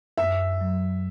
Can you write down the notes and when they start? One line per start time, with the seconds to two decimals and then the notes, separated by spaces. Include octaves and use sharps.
0.18 F#2 E5
0.61 F#3